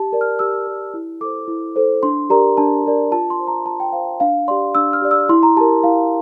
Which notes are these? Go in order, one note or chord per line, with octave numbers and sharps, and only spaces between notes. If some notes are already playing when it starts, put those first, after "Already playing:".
Already playing: G4 A5
A#4 D5
F6
G4 E6
A#4 D5
E4
A4 C5 D6
E4
A4 C5
D4 C6
G4 A#4 D5 A#5
D4 A5
G4 A#4 D5
F4 A5
C6
C5
A#5
F4 A5
G5
C5 F5
D4 F5
G4 D5 C6
D4 E6
F6
G4 D5
E6
E4 C6
A#5
G4 A#4 A5
E4 F5